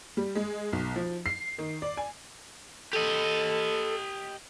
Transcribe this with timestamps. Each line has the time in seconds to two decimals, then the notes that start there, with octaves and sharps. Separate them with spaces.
0.17 G3
0.35 G#3
0.73 B1
0.96 F3
1.26 C7
1.58 D#3
1.82 D5
1.97 G#5
2.93 G4 A4 D#5